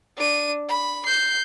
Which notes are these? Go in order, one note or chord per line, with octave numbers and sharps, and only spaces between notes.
D4 D#7
B5
G6 C7